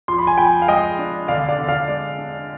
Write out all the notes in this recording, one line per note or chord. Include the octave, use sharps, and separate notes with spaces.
F3 C6
B5
G#5
F3 G5 B5
F5
G#3 D#5 G5
D4
D3 D5 F5
D5 F5
D3
D5 F5
G#3 D5
D4